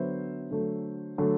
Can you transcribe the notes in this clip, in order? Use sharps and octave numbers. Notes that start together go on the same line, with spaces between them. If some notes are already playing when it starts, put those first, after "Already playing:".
Already playing: D3 F#3 B3 C5 E5
D3 F#3 A3
D3 F#3 A3